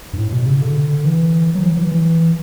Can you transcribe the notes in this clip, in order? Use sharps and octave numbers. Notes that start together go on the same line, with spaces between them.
G2
A2
B2
C#3
D3
E3
F#3
E3
E3
E3